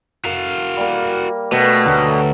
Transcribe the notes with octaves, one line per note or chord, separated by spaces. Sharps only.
F#4 A#4 F5
G3 A#3
B2 A3 E5
D2 F#3 A3